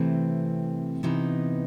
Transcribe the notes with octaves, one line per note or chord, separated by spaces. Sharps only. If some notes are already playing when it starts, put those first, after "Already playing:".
Already playing: C3 E3 A3 C4
C3 E3 B3 D#4